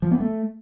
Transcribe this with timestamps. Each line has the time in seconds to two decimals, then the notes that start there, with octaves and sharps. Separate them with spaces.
0.02 F3
0.11 B3
0.20 A3